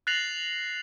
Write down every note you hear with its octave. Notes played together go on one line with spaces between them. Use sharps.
F#6 A6 A#6 C7 F7 F#7